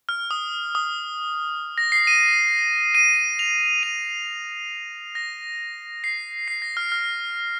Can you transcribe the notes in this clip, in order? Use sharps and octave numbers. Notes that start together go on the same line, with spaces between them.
F6
D#6
D#6
A#6
C7
D#7
D#7
F7
D#7
A#6
C7
C7
A#6
F6
F6